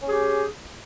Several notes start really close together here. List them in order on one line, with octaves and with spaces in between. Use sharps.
C#4 G#4 G4